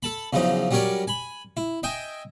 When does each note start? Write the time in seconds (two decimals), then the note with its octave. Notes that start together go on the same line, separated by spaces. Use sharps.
0.03 A4 A5 B5
0.33 E2 C#3 F3 F#3 D#4
0.71 F#3 G3 C#4 A#4 C#5 D5
1.07 G#5 B5
1.57 E4
1.83 D#5 E5 G5 G#5